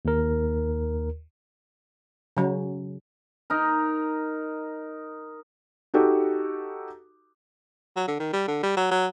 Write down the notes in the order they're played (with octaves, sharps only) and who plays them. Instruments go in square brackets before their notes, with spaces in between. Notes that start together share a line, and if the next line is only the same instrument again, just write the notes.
[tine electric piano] D#2 A#4
[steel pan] C#3 F#3
[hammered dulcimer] D#4 A#4
[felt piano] D#4 F#4 G4 A4
[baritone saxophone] F#3
D3
D#3
G3
D3
G3
F#3
F#3